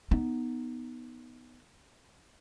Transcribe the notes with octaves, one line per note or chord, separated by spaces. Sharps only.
B3 D#4